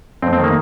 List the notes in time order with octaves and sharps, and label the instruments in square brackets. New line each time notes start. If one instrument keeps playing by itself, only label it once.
[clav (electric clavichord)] F2 C4
C4
D#3 A#3